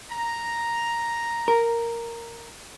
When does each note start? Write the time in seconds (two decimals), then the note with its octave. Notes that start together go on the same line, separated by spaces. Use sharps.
0.10 A#5
1.48 A#4